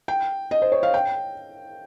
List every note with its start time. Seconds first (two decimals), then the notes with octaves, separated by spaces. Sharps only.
0.08 G5
0.51 D#5
0.62 C5
0.72 C#5
0.83 F5
0.94 G5